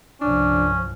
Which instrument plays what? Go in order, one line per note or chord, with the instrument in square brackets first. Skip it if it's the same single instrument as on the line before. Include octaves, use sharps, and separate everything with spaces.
[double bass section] C2 G2 F3 [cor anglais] C#4 [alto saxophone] D4